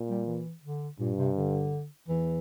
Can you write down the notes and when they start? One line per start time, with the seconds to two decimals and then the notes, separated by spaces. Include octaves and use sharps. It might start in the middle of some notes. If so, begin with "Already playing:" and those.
Already playing: A#2
0.09 G3
0.27 E3
0.63 D3
0.99 G2 A#2
1.18 C3
1.36 D3
2.08 E2 E3